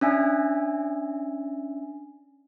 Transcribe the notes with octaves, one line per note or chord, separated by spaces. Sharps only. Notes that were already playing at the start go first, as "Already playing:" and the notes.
C#4 D4 E5 G#5